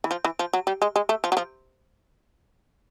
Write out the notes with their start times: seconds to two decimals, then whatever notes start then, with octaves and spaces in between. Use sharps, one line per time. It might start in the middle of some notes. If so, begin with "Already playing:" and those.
0.04 E3
0.11 F3
0.25 E3
0.39 F3
0.53 F#3
0.67 G3
0.82 G#3
0.96 G#3
1.09 A3
1.24 F3
1.32 F#3
1.37 F3